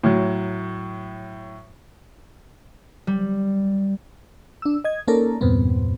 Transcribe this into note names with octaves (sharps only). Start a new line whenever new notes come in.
A2 F#3
G3
D4 E6
D#5 G#6
A#3 C#4 D#4 A4 A#4 D5
E2 G2 A#2 B3 C4